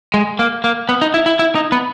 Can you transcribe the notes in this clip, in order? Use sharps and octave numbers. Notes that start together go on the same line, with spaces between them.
G#3
A#3
A#3
B3
D#4
E4
E4
E4
D#4
B3